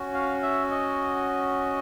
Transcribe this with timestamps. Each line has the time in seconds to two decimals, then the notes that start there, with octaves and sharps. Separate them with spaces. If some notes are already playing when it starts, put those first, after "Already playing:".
Already playing: C#4 F#4
0.14 F5
0.43 E5
0.71 D#5